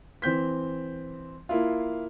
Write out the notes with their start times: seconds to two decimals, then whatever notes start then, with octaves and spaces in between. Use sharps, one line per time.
0.22 E3 C4 G6 B6
1.49 A#3 E4 F4